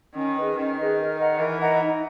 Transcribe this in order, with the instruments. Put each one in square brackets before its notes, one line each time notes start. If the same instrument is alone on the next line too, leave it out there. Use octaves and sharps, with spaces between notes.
[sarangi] D#3 [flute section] C#4
[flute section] G#4 B4 D#5
[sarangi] D#3 [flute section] C#4
[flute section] G#4 B4 D#5
A#4
D#5 F#5 A#5
[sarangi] E3 [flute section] A#4
[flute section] D#5 F#5 A#5
D#4